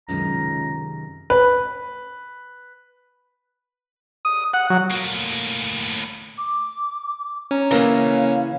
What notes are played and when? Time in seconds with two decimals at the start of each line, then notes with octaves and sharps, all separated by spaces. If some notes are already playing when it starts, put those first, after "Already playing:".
0.09 C#2 F#2 C3 D#3 A#5
1.30 B4
4.25 D#6
4.54 F#5
4.70 F#3
4.91 A2 A#3
6.38 D6
7.51 C#4 A#5
7.71 C#3 E3 A#3 A#4 F5 A#5